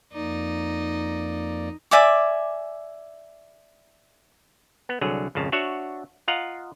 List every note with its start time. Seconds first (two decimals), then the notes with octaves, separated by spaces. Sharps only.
0.13 F2 A#3 D#4 D5
1.91 D5 E5 G#5 D6
4.89 B3
5.01 C2 D3 F#3 G#4
5.35 G#1 F2 C#3 A5
5.52 D4 F#4 C#5 E5 F#5
6.28 F4 D#5 F5 F#5 A#5